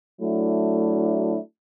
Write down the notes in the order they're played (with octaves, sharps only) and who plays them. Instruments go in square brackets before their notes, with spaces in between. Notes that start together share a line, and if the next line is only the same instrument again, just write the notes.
[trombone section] F#3 A3 D4 E4